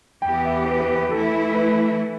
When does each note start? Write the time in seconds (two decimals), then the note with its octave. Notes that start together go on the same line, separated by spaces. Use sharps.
0.22 E2 E3 B3 G4 G5
0.45 E5
0.66 B4
0.80 B4
0.95 B4
1.10 E3 A3 E4 A4
1.55 B4